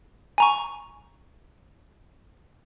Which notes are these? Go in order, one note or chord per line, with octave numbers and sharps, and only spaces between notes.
G#5 A#5 C#6